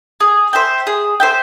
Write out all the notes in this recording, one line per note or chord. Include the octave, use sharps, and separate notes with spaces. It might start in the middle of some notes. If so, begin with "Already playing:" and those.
G#4
C5 E5 G5
G#4
C5 E5 G5